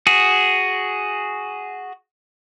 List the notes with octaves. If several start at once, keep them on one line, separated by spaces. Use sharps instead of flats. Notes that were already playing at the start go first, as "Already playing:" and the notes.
F#4 G#4